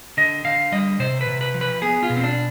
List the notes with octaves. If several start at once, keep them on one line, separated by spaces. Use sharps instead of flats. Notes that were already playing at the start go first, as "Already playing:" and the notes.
D3 D#5
D3 F5
G3 D#5
C3 C5
B4
C3
B4
F3
B4
B3 G#4
F4
B2
C4
D4